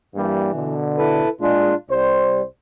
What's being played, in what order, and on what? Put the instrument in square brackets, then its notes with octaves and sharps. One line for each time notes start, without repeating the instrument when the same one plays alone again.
[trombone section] G2 G3 A#3 [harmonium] E3
[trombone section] B2 D3
[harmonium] E4 A4 B4
[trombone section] A#2 G#3 [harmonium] D4 F4
[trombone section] C2 C5 [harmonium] G3